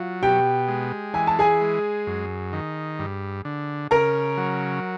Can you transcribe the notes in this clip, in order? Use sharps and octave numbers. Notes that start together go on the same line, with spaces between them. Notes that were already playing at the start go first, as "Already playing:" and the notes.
Already playing: F#3 F4
B2 G4 G5
G#3
E3 G#5
A5
G#4 G#5
G#3
F#2
D#3
G2
D3
C#3 A#4 A#5
F#3